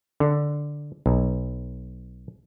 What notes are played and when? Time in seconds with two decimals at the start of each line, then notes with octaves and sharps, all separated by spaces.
0.20 D3
1.06 B1